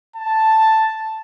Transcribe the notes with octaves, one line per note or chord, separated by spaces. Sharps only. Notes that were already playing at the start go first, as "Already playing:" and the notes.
A5